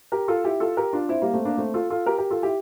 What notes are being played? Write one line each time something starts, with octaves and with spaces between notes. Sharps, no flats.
G4 A#4
F4 A4
E4 G4
F4 A4
G4 A#4
D4 F4
C4 E4
G3 A#3
A3 C4
A#3 D4
A3 C4
F4 A4
F4 A4
G4 A#4
G4 A#4
F4 A4
E4 G4